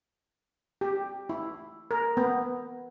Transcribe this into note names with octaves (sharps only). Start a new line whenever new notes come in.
G4
E4
A#4
B3